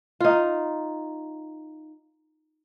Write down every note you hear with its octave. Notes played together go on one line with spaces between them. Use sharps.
D#4 F4